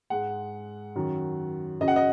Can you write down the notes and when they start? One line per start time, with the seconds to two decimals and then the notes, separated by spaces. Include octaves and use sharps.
0.10 G#2 G#3 F#5
0.96 F#2 D#3 F#3
1.80 F#2 C#3 F#3 D#5
1.88 F#5
1.96 D#5